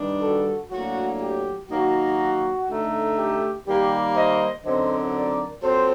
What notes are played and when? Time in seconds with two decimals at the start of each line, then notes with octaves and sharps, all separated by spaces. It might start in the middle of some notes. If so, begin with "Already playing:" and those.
Already playing: G2 D#3 G3 D4
0.22 F#4 A4
0.71 A2 F#3 A#3 D4 F#4
1.20 G4
1.69 D#3 F#3 A#3 D#4 F#4
2.68 D3 A3 D#4
3.17 G4
3.66 D#3 G3 A#3 G4
4.15 C5 D#5
4.64 F#2 D3 F#3 C4 D#4 C5 D#5
5.14 A#4 D5
5.62 A#2 F#3 C4 A4 C5